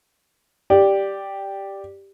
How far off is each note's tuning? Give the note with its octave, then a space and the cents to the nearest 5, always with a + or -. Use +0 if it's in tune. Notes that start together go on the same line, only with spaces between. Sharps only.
G4 +0 D5 +0